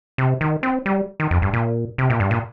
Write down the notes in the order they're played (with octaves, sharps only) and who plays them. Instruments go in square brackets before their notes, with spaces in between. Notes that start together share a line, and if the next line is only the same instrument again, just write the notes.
[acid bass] C3
D#3
C4
G3
D#3
F2
G2
A#2
C3
A#2
G2
A#2